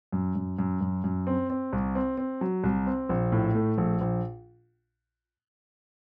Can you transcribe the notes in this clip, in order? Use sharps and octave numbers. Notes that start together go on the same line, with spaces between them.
F#2
F#2
F#2
F#2
F#2
C4
C4
C2
C4
C4
F#3
C2
C4
A#1
A2
A3
A#1
A#1